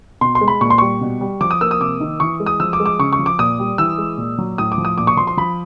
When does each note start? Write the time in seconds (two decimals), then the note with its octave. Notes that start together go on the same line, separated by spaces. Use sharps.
0.21 B2 C6
0.35 C6
0.41 G#3
0.48 B5
0.61 A#2 C#6
0.70 C6
0.78 G3 C#6
1.01 B2
1.21 G3
1.41 F3 D6
1.51 D#6
1.61 A#3 E6
1.71 D#6
1.80 C3 D6
2.00 D#3
2.20 E3 C#6
2.40 G#3
2.46 D#6
2.60 F3 E6
2.73 D6
2.80 G#3
2.86 D6
2.99 C#3 C#6
3.13 C#6
3.19 F3
3.26 D6
3.39 A#2 D#6
3.59 G3
3.78 E3 E6
3.98 G#3
4.18 A#2
4.38 F#3
4.58 A2 D#6
4.72 D6
4.78 F3
4.85 D#6
4.98 A#2 D6
5.07 C#6
5.17 F3 C6
5.27 C6
5.37 F3 B5